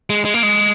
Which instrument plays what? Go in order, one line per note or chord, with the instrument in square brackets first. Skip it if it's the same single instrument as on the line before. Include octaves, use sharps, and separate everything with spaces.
[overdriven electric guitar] G#3
G#3
A#3
G#3